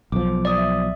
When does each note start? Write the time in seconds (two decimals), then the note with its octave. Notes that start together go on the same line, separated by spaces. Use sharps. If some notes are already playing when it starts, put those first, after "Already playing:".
0.12 B1 F3 D6
0.45 D5 D#6
0.58 E5